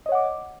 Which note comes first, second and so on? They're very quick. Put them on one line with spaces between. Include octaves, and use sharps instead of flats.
D#5 C#5 F#5 D6